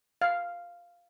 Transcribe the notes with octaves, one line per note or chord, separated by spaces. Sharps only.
F5